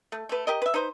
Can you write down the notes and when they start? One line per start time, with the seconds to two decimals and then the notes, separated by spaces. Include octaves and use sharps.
0.12 A3
0.29 A3 B4
0.47 G4 A#4 D#5
0.62 B4 E5
0.74 D#4 B4 C5